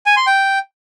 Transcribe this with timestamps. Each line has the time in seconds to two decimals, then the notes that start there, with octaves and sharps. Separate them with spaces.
0.06 G#5
0.16 C6
0.27 G5